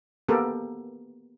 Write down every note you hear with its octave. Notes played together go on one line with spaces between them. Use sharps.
A#3 B3 G4 A4 A#4